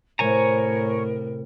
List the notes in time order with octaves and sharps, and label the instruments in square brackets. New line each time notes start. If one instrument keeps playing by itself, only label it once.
[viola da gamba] A2 [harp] C3 [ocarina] A#4 [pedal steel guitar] C#5 G#5 A#5